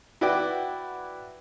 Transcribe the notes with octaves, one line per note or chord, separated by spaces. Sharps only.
E4 F#4 B4 D5 G5 D6